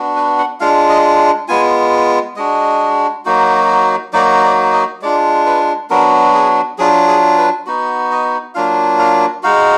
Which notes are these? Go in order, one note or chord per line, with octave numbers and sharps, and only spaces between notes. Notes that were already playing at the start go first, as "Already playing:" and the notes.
Already playing: B3 D4 F#4
B4
F#5
G#3 D4 F4 F5
D#5
G#3 B3 F4 G#5
G#3 D4 F#4 D#5
F#3 A#3 D#4 F#4
F#3 A#3 D#4 F#4 D5
D5
D#5
G#3 D4 F4 D5
B4
F#3 B3 D4 F#4 A#4
G#4
F#3 D4 F4 G#4
G#4
B4
B3 D#4 F#4
D#5
F#3 A#3 D4 F4 F5
F5
G#3 D#4 F#4 F5